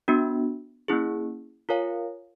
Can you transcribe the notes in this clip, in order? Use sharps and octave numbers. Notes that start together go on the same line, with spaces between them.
B3 D4 F#4
A#3 C#4 E4 G#4
F4 A#4 C#5 F5 G#5